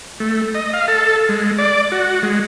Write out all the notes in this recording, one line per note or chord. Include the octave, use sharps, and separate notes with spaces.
A3
D#5
F5
A4
G#3
D5
F#4
G#3